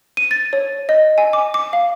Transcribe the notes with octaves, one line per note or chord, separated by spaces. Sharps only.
D#7
A6
C#5
D#5
G#5
D6
D6
F5